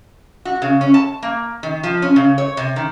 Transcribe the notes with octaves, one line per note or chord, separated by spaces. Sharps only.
F#4
C#3
C#4
A5
A#3
D#3
F3
C#4
C#3
C#5
C3
D#3